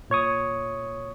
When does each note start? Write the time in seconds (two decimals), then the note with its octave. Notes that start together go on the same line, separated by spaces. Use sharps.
0.10 A#2 C#5 C#6 D#6